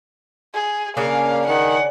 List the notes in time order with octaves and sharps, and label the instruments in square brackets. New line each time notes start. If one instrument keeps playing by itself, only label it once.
[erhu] G#4
[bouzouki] C#3 C#4 D4 [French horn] A#3 [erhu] F5
[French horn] D#3 [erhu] F#5